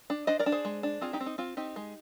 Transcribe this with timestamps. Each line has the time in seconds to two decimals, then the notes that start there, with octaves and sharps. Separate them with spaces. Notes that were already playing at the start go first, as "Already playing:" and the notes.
0.10 D4
0.27 D4 C5 D#5
0.39 A#4 D5
0.46 D4
0.52 G#4 C5
0.65 G#3
0.83 D4
1.01 C4 F4 G#4
1.13 D#4 G4
1.20 C4
1.26 D#4
1.38 C4 F4
1.57 C4 D#4 G4
1.76 G#3